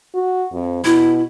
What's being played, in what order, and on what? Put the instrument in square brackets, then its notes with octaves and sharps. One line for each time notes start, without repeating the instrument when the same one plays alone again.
[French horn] F#4
F2
[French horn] B2 [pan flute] E4